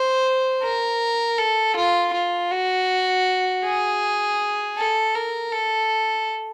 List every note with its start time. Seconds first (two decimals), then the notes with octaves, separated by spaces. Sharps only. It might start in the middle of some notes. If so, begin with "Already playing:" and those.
Already playing: C5
0.63 A#4
1.38 A4
1.76 F4
2.13 F4
2.51 F#4
3.65 G#4
4.77 A4
5.15 A#4
5.52 A4